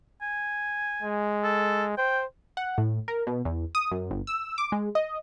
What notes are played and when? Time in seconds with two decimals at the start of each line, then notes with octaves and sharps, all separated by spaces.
0.22 G#5
1.02 G#3
1.44 A4
1.97 C5 G5
2.57 F#5
2.78 A2
3.08 A#4
3.27 B2
3.45 E2
3.75 D#6
3.92 F#2
4.11 G1
4.27 E6
4.58 D6
4.72 G#3
4.95 D#5